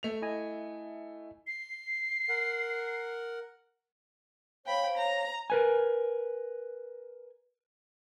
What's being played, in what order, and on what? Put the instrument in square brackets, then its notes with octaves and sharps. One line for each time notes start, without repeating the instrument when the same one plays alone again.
[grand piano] A3 F7
[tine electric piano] E4 D#5 G#5
[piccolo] C7
[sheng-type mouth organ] A#4 F#5
[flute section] C5 C#5 F5 [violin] G5 B5
[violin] A#5
[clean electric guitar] A#4 B4 G#5